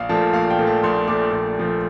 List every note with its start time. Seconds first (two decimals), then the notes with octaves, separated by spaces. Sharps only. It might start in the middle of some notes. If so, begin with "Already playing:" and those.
Already playing: A#1 F5
0.09 A#2 F3 A3 A5
0.33 A#1 F5
0.50 G5
0.59 A#2 F3 A3
0.67 A5
0.83 A#1 C6
1.08 A#2 F3 A3 D6
1.32 A#1
1.57 A#2 F3 A3